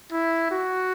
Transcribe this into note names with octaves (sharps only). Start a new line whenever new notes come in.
E4
F#4